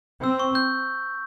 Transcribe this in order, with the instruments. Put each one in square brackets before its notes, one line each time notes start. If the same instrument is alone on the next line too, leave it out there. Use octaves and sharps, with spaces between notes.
[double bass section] C4 [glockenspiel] E6
[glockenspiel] C#6
G6